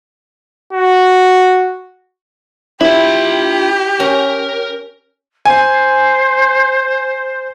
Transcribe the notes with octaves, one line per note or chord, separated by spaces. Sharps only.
F#4
E4 F4 G4 B5
C#4 A#4
C5 G#5